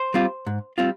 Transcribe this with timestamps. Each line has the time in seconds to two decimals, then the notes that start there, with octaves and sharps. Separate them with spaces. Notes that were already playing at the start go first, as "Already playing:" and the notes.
Already playing: C5
0.14 G3 C4 F4
0.47 G#2
0.78 G3 C4 F4